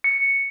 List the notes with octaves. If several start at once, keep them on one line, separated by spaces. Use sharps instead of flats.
C#7